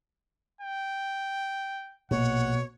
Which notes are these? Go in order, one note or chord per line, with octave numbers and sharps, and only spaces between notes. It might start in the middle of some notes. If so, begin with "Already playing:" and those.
G5
A#1 B2 C#5 F#5